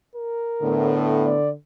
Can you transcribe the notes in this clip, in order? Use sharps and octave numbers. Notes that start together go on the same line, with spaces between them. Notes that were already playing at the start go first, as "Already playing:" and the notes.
A#4
A2 D3 B3
D5